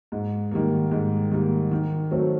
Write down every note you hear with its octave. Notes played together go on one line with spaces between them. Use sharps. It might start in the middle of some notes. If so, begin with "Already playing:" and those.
G#2
D#3 G3 A#3
G#2
D#3 G3 A#3
D#3
F#3 A3 C4